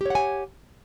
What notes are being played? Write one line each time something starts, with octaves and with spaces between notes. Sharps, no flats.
G4 C#5 F#5 G#5